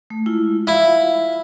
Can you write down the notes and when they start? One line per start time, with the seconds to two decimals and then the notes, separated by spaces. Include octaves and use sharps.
0.10 A3
0.26 G#3 E4 F4
0.67 E4 F4 F5